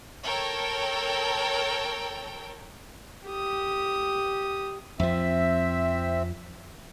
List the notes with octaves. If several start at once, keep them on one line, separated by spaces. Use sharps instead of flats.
A4 A#4 C#5 G5
G4 D#6
F2 F3 C4 E5